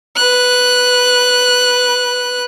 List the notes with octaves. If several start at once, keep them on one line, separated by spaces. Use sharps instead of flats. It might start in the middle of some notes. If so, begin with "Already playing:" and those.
B4 F#6